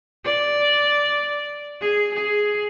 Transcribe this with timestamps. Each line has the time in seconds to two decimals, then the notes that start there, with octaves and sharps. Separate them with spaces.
0.25 D5
1.81 G#4
2.15 G#4